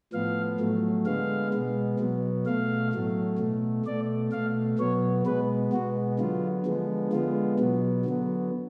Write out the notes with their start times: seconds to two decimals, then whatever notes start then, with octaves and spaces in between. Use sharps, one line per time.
0.13 A2 F3 B3 F5
0.59 A2 F#3 A3
1.06 D3 G#3 B3 F5
1.53 B2 G#3 B3
2.00 B2 F#3 B3
2.46 B2 A3 F5
2.93 A2 F#3 A3
3.39 B2 A3
3.86 B2 A3 D5
4.32 B2 A3 F5
4.79 B2 F#3 B3 C#5
5.26 B2 G#3 B3 B4
5.73 B2 G#3 B3 F#4
6.19 D3 F#3 B3 F4
6.66 D3 F3 G#3 B3
7.12 D3 G#3 B3 F4
7.59 B2 F#3 B3
8.05 D3 F#3 B3